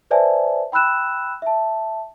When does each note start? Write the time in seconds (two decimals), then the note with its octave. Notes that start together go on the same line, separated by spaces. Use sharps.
0.11 B4 C5 D5 E5 G#5 A5
0.72 G5 B5 E6 F#6 E7
1.42 E5 A5